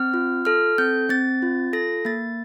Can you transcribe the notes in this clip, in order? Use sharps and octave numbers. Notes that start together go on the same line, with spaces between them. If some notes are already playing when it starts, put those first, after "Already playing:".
Already playing: C4 F6
F4
A4 F6
C4 G6
C4 A6
F4
A4 A#6
A#3 A6